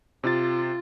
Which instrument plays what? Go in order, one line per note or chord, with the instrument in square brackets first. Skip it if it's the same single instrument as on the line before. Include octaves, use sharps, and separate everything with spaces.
[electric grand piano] C3 A6 [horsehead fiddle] F4